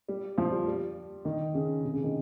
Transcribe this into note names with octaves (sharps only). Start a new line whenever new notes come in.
G3
F3
G3
G3
D#3
C#3
C3
C#3
D#3